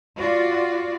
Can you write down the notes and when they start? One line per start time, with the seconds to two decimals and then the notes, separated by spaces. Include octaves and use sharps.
0.16 F4 F#4 D5